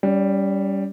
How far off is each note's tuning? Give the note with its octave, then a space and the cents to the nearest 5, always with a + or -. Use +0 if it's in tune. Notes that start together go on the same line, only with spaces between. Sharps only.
G3 +0 C#4 +35